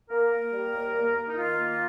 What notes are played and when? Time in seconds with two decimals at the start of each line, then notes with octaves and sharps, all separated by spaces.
0.10 A#3 A#4
0.32 A#3
0.53 G3
0.74 D#2
0.94 A#3
1.15 A#3
1.28 D#4
1.36 D#3 F4
1.57 A#3